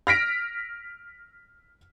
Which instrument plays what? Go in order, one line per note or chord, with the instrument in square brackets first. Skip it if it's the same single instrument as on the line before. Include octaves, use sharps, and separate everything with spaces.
[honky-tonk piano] F6 A#6 B6 D7